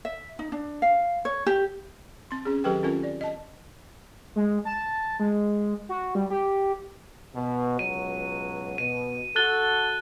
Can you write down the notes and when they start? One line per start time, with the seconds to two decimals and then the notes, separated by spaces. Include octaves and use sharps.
0.05 E5
0.39 D#4
0.52 D4
0.82 F5
1.25 C#5
1.46 G4
2.31 C4 C6
2.45 C#4 G#4
2.64 D#3 F#3 G4 A4 B4 G5
2.83 C4 C#4 F4 A4 A#4 G#5
3.03 D5
3.21 D#5 A5
4.36 G#3
4.65 A5
5.20 G#3
5.89 F#4
6.15 G3
6.30 G4
7.35 B2
7.79 C#2 B2 F#3 D#7
8.78 B2 D#7
9.36 F#4 A4 F#6 A6 G7